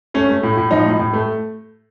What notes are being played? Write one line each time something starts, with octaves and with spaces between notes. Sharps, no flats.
A3 C#4
A3
A2
A2
F3 D#4
A2
A2
A3